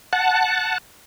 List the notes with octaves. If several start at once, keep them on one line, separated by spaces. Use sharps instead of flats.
F#5 A5